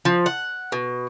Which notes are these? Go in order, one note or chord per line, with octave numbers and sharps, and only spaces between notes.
F3
F#5
B2